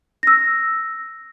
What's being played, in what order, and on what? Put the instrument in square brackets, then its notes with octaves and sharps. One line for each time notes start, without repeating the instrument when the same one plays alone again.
[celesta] E6 A#6